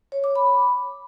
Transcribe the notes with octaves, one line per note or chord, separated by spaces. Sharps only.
C#5
D6
B5